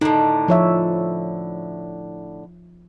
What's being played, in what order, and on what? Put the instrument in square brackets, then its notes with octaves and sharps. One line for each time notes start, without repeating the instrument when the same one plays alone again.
[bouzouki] A2 D3 [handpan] D#4
[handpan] F3 C#5 E5